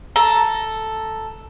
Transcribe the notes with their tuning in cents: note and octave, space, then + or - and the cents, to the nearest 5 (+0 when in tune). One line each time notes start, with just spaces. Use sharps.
A4 +0 A#5 +10